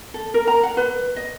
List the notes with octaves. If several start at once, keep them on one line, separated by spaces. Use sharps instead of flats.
A4
A#4
A#5
F#5
B4
D#5